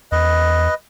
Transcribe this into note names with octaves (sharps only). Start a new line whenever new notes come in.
E2 B4 D#5